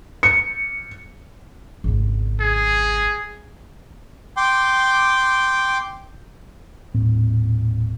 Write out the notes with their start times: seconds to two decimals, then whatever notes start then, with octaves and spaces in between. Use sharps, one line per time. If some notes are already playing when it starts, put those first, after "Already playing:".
0.23 C#7
1.84 G#1 C#2
2.40 G#4
4.37 G5 C6 D6
6.94 D#1 A2 C4